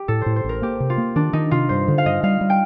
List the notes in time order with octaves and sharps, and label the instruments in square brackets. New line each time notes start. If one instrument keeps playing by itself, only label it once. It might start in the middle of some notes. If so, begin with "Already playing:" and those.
Already playing: [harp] G4
[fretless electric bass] A2 [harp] A4
[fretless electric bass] A2 [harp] C5
[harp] C5
[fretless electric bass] A1 [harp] A#4
[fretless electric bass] A#3 [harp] G4
[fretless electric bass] C3
[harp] F4
[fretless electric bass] A#3
[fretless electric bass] D#3 [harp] D4
[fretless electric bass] D#3 [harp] D#4
[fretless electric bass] C3 [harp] F4
[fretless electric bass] G2 [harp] C5
[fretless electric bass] D3
[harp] F5
[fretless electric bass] G2 [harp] D#5
[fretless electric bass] G3 [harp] F5
[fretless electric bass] G3
[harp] G5